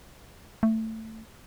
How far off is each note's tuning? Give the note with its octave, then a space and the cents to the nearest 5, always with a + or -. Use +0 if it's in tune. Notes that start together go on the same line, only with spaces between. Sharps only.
A3 +15